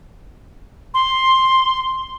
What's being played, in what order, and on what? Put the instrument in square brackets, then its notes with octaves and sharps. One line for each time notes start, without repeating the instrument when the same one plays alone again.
[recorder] C6